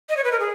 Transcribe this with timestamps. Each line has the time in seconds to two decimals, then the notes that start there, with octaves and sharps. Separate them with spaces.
0.09 D#5
0.17 C#5
0.24 B4
0.32 A#4
0.40 G#4